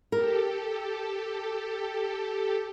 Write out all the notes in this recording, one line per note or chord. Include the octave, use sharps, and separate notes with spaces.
G4 A4 A#4